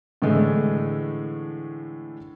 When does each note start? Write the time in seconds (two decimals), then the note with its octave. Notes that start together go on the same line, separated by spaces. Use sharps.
0.22 A2 D3 E3 G#3 A3